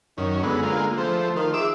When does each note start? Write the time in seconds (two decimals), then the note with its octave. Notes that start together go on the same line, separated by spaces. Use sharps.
0.18 F#2 D#3 C#4
0.43 D3 G#3 B3
0.63 G#3 A#3 F4
0.98 F3 A3 C5
1.36 D#3 F4
1.54 G#4 E5 D6 E6